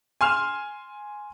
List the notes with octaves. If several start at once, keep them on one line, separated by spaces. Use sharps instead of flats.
G#5 C6 F6 E7 F7